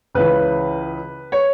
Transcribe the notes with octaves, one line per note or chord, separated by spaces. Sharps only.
C#2 C#3 E3 B4
C#5